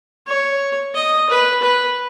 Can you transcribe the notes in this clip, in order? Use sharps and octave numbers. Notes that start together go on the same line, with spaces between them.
C#5
D#5
B4
B4